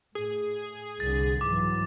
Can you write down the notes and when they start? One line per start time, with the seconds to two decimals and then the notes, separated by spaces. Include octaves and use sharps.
0.15 A2 G#4
1.00 C2 D3 A6
1.41 G#2 E3 F#3 D6